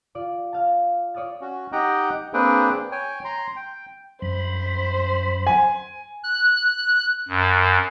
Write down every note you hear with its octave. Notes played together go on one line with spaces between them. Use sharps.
F4 D5
F5 A5
C#5 D5 D#6 F6 A6
C#4 F#4
D#4 G4 D#5 F#5 G5 A#5
A#3 C4 D4 G#4 B4 G5
C#5 G5 G#5
A#5 C6
G5
F#2 C5 B5
G#5
F#6
F#2